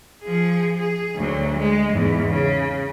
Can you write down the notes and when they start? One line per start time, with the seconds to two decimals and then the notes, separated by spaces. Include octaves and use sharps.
0.23 F3 G#4
0.78 G#4
1.16 D2 F#3
1.57 G#3
1.93 E2 G#2
2.28 C#3